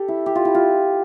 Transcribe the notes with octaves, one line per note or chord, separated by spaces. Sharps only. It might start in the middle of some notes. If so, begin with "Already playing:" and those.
Already playing: G4 A4
E4
G4
F4
E4
F4